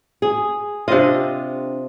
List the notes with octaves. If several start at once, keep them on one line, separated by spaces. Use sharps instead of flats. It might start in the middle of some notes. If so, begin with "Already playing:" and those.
G#4
C3 C4 D4 F4 D#5